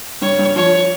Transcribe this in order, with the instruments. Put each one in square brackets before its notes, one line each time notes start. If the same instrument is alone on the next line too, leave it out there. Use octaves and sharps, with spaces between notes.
[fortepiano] G2 [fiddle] C#5
[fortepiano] G2
[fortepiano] F3 [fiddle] C#5